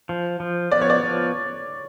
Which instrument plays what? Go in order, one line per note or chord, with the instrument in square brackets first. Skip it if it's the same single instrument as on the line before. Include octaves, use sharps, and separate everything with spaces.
[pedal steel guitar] F3
F3
[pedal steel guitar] B3 [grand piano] D5
[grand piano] C#5
D5
[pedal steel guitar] F3